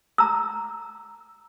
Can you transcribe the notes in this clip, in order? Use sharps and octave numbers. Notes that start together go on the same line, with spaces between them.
A#5 E6